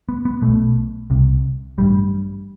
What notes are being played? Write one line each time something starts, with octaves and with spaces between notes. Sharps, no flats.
B3
B3
B1 B2 A3
C2 C3
A1 G2 G3